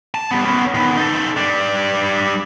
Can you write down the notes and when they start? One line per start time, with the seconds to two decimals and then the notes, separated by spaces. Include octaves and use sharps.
0.15 A5
0.31 G3 B3
0.45 B3 C#4
0.75 D#3 B3
0.97 D#4 A4
1.37 G3 D4